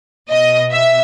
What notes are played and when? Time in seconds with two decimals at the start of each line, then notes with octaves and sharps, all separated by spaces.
0.30 B2 D#5
0.72 E5